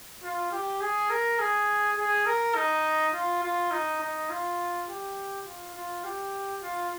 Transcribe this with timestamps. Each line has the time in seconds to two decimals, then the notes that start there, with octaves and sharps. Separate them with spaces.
0.23 F4
0.51 G4
0.81 G#4
1.10 A#4
1.39 G#4
1.97 G#4
2.26 A#4
2.55 D#4
3.14 F4
3.43 F4
3.71 D#4
4.01 D#4
4.30 F4
4.87 G4
5.46 F4
5.74 F4
6.04 G4
6.62 F4